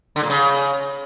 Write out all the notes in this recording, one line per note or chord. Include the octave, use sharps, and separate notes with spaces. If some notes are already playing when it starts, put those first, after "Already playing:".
D3
A#2
C#3